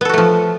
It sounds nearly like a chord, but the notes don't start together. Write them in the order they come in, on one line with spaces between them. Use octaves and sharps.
B3 A4 F#4 A3 F3